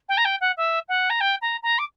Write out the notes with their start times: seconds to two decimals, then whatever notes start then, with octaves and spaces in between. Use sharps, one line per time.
0.09 G5
0.17 A#5
0.25 G5
0.40 F#5
0.57 E5
0.88 F#5
1.10 A#5
1.20 G5
1.41 A#5
1.63 A#5
1.78 D6